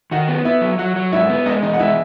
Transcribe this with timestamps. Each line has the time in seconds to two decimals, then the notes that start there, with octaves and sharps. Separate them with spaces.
0.11 D#3 F#4 F#5
0.28 B3
0.45 B3 E4 E5
0.61 F#3
0.79 F#3 F#4 F#5
0.96 F#3
1.12 G#2 E4 E5
1.29 B3
1.45 G#3 D#4 D#5
1.62 E2 D#4 D#5
1.74 F#5
1.79 G#3 E4 E5